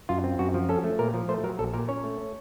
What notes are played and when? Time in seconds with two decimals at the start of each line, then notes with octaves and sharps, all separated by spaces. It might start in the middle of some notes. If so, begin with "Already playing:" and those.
0.09 F#2 F4
0.24 C4
0.39 F#2 F#4
0.54 F3
0.69 C#4 A4
0.84 A3
0.99 A#2 A#4
1.14 F3
1.29 A3 C5
1.44 F#3 A#4
1.59 A#1 A4
1.73 A#2 A#4
1.88 C#4 C#5
2.04 A3